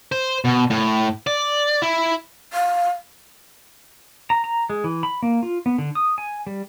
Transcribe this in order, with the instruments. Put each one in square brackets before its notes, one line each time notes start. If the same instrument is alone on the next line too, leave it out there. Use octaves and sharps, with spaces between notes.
[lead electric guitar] C5
B2
A2
D5
E4
[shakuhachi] F5
[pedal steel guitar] A#5
A#5
G#3
E3
B5
A#3
F4
B3
D3
D#6
G#5
G3